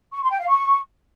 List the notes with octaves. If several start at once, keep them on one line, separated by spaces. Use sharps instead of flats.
C#6
C6
G5
F5
C#6